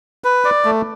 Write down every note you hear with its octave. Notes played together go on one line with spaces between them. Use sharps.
B4
D5
A3